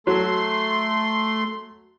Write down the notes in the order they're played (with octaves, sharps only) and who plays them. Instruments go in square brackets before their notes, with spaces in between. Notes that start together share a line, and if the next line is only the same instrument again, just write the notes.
[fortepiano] F#3 [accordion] A3 C6